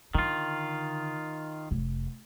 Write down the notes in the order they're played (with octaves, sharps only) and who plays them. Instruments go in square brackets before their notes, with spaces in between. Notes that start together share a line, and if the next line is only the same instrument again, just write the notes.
[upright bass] D3 [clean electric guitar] D#3 F4
[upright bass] F1